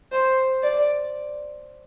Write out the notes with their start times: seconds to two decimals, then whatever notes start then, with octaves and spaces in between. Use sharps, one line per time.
0.12 C5
0.63 D5